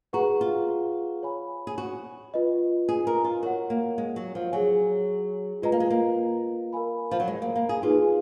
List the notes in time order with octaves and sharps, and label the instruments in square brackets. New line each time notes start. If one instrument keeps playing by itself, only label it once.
[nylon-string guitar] F#4 [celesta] G#4 B4 F#5 A#5 C#6
[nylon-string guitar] F4
[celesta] C#5 G#5 B5
[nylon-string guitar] G#4
F#4
[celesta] F4 B4 D#5
[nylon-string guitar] G#4
A#4
F4
[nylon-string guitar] F#4 [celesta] A#4 C#5 F#5
[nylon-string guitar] A#3
G#3
F#3
F3
[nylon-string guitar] F#3 [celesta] G#4 C#5 G#5
[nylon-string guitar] G#3 [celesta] F4 B4 D#5 A#5
[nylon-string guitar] A#3
G#3
A#3
[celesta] A#4 F5 G#5 B5
[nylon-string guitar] F3
F#3
G#3
A#3
A#3
G#4
[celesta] D#4 G#4 B4 F5 G#5 [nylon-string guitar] F4